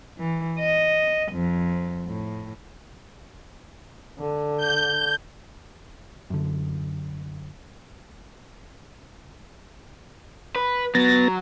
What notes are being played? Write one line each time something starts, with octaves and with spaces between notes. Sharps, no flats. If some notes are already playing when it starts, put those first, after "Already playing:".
E3
D#5
F2
A2
D3
G6
F#2 D3
B4
F#3 B3 A6 A#6